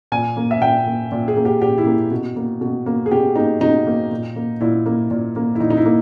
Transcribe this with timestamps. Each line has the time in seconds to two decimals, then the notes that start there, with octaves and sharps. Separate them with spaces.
0.12 A#2 G#5
0.37 A#3
0.51 E5
0.61 A#2 G5
0.86 A#3
1.12 A#2
1.28 G#4
1.36 A#3
1.45 G4
1.62 A#2 G4
1.78 E4
1.86 A#3
2.11 B2
2.36 A#3
2.61 B2
2.86 A#3
3.06 G#4
3.11 B2 G4
3.36 A#3 D#4
3.61 B2 D#4
3.87 A#3
4.11 A#2
4.36 A#3
4.61 A#2 E4
4.86 A#3
5.11 A#2
5.36 A#3
5.55 E4
5.60 A#2 D#4
5.70 D#4
5.77 E4
5.85 A#3